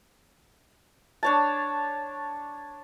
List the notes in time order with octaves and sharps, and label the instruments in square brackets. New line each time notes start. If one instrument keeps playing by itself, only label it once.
[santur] D4 C#5 A5